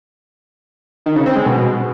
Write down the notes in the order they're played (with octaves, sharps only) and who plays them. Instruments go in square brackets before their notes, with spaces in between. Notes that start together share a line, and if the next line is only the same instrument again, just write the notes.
[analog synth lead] D#3
C#3
C4
G#3
B2